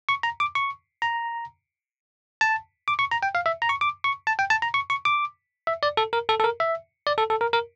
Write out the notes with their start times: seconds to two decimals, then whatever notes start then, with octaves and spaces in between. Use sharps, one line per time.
0.09 C#6
0.23 A#5
0.40 D6
0.55 C#6
1.02 A#5
2.41 A5
2.88 D6
2.99 C#6
3.11 A#5
3.23 G5
3.35 F5
3.46 E5
3.62 A#5
3.69 C#6
3.81 D6
4.04 C#6
4.27 A5
4.39 G5
4.50 A5
4.62 A#5
4.74 C#6
4.90 C#6
5.05 D6
5.67 E5
5.83 D5
5.97 A4
6.13 A#4
6.29 A4
6.40 A4
6.44 A#4
6.60 E5
7.07 D5
7.18 A4
7.30 A4
7.41 A#4
7.53 A#4